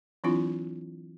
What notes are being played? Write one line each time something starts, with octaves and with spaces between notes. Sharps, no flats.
E3 F#3 C4 D4 E4 F4